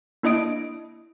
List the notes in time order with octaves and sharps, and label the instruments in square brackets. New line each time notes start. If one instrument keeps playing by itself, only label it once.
[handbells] A#3 D4 E4 D#5 D#6 D7